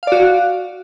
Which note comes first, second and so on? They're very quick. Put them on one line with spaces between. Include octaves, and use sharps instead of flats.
F5 D5 F#4